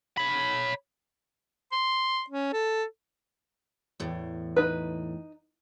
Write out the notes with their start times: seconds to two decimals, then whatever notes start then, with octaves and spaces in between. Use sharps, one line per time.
0.17 C#5 B5
1.72 C6
2.30 C#4
2.53 A4
4.00 E2 A2
4.56 D#4 B4